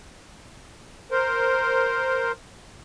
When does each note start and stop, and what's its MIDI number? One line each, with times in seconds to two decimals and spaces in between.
1.11 2.32 70
1.11 2.32 72